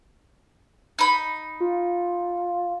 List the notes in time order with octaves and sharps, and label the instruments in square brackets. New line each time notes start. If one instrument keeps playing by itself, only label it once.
[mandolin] D#4 B5
[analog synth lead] F4